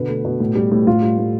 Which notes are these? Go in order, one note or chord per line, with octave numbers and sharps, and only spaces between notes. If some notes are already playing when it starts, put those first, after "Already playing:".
Already playing: B2 D3 B4
A3
B2
A2
G3
A2
A2 F4
G3
A2